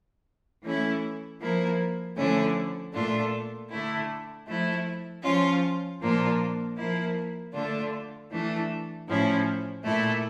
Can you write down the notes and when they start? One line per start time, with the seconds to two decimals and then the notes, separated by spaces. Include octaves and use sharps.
0.63 E3 A3 C#4 E4
1.40 F3 A#3 E4
2.17 D3 F3 A3 C#4 E4
2.93 A#2 A3 D4 F4
3.70 D3 A3 E4
4.47 F3 A3 E4
5.24 F3 C#4 F4
6.00 A#2 F3 A#3 D4 F4
6.77 F3 A#3 E4
7.53 D3 A3 D4 F4
8.30 E3 A3 D4
9.07 A2 F3 C#4 E4
9.84 A#2 A3 E4